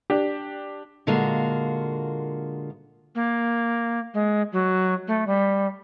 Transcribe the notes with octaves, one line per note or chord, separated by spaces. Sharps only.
D4 G4
A#2 D3 G#3 A#3 F4 F#4
A#3
G#3
F#3
A3
G3